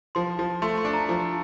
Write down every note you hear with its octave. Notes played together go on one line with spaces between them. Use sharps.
F3 C6
F3
A3 C6
C6
D4
A#5
F3